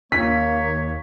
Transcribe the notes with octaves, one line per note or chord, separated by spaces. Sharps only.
D#2 A#3 C#5 B6